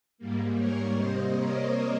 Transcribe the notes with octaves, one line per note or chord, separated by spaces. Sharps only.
G#2 G3 A#3
A#4 C#5
C3 G3 A#3 C5 D#5
A#4 C#5